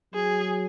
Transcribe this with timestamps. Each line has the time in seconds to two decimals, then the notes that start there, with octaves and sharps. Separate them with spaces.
0.14 F#3 G#4